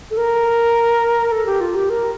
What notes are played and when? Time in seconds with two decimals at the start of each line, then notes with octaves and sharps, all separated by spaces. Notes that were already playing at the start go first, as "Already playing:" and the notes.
0.11 A4
0.17 A#4
1.32 A4
1.46 G4
1.61 F4
1.76 G4
1.90 A#4